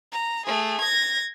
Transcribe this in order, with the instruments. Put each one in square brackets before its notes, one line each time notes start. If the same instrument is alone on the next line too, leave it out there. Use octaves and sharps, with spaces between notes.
[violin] A#5
A3 G#4
G#6 A#6